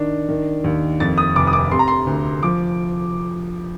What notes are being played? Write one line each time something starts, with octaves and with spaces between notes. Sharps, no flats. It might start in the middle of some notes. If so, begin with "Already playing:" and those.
Already playing: D#3 D4
D#3
D#2
F2 A6
D#6
F1 D6
D#6
D6
C3 C6
A#5
C6
D2
F3 D6